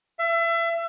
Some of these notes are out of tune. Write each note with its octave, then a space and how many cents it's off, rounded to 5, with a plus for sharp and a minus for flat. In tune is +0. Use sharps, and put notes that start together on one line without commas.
E5 +30